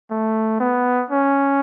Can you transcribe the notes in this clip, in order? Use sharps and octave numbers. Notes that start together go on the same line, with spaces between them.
A3
B3
C#4